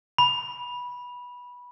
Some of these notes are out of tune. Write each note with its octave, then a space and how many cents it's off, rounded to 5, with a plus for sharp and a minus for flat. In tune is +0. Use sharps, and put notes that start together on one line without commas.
B5 -15